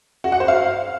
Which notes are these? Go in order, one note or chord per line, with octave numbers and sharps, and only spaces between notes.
F#4
F#5
C5
F5